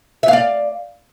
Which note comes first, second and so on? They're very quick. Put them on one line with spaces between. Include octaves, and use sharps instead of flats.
E5 F5 D5